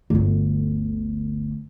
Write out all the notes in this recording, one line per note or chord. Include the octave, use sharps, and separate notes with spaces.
G1 D2